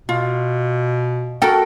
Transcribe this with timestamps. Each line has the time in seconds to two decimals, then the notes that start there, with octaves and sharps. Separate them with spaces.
0.09 B2 F4
1.42 F#4 A4 A#4 G5